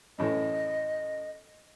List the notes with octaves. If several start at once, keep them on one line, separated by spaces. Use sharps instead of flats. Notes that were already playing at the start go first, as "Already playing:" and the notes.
F#2 A2 E3 D#5